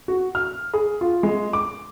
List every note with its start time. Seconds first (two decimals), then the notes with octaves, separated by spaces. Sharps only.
0.08 F#4
0.35 F6
0.74 G#4
1.01 F4
1.23 G#3
1.53 D6